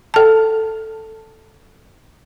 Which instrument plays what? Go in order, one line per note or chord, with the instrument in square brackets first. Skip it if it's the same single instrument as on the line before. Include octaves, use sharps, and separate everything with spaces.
[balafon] A4 A5